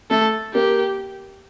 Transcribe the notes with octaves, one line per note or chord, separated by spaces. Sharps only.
A3 A4
A#3 G4